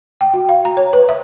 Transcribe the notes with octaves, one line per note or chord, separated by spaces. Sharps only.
G5
F#4
F5
A#5
C#5
B4
E5